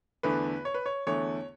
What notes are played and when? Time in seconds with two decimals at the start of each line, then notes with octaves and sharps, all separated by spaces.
0.23 E2 D3 A3 B4
0.65 C#5
0.74 B4
0.86 C#5
1.07 E2 D3 A3 C#5